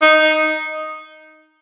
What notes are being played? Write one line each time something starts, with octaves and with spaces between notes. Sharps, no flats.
D#4